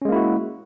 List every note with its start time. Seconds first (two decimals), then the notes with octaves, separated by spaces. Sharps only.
0.02 C#4
0.05 G#3
0.09 A#3
0.12 E4
0.16 F#4